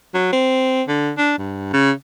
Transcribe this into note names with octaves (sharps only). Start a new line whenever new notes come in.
F#3
C4
D3
D4
G2
C#3